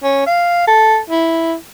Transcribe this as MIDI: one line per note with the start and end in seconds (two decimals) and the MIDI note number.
0.03 0.26 61
0.27 0.63 77
0.68 0.99 69
1.10 1.55 64